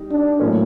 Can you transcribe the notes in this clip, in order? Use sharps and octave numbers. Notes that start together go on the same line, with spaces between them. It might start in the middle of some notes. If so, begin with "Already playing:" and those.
Already playing: G3 D#4
D4
A2 F#3 A#3 C#4